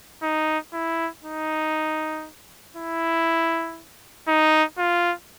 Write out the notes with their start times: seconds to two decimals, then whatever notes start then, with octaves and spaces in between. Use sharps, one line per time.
0.23 D#4
0.73 E4
1.24 D#4
2.76 E4
4.28 D#4
4.78 F4